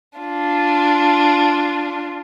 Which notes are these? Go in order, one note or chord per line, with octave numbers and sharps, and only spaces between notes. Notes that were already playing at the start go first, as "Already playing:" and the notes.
D4 F4